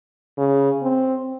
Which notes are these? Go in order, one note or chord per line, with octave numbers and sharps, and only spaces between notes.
C#3
C4